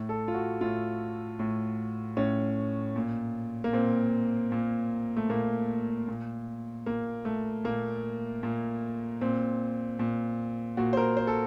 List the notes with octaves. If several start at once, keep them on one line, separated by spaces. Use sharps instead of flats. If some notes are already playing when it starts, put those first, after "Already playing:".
Already playing: A2
A4
F4
F#4
A2 F4
A2
A2 C#4
A#2
A#3
A#2 C4
A#2
A3
A#2 A#3
A#2
A#2 A#3
A3
A#2 A#3
A#2
A#2 C4
A#2
A#2 F#4
C5
A#4
C5
A4